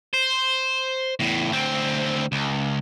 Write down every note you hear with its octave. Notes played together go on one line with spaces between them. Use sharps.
C5
E2 A2
D2 C4
C#2